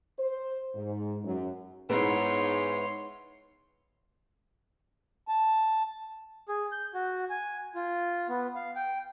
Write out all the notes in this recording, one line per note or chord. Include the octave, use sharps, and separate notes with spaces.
C5
G#2
F#2
G#2 B3 D#4 E4 C#5 C6
A5
G#4
G6
F#4
G#5
F4
B3
F5
G5